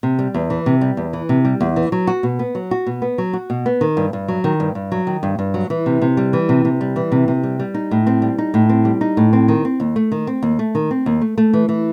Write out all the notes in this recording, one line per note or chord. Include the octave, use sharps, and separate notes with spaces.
C3
G3
E2
E3
C3
G3
E2
E3
C3
G3
E2
E3
F#3
F#4
B2
B3
F#3
F#4
B2
B3
F#3
F#4
B2
B3
D#3
G2
G2
F#3
D#3
G2
G2
F#3
D#3
G2
G2
F#3
E3
C3
C3
G3
E3
C3
C3
G3
E3
C3
C3
G3
G3
D#4
A2
C4
G3
D#4
A2
C4
G3
D#4
A2
C4
D#3
C4
D#2
A3
D#3
C4
D#2
A3
D#3
C4
D#2
A3
A3
E3
E3